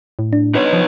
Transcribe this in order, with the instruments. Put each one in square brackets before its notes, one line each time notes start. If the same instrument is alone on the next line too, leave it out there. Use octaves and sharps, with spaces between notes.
[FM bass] A2
[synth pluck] D4
[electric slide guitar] D#4 B4 C#5
[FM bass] F3